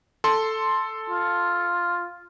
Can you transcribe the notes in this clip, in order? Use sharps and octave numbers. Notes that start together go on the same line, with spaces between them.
A4 C6
F4